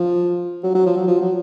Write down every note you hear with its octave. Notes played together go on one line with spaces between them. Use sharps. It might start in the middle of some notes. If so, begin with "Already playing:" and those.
Already playing: F3
F#3
F#3
F3
F#3
F3
F#3